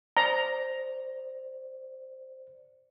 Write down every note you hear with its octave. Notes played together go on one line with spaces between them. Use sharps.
C5 D5 A#5